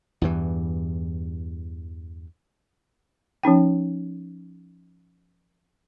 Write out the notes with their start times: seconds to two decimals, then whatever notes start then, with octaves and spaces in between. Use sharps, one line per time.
0.22 E2 G2 E3
3.43 F3 C#4 D#4 G5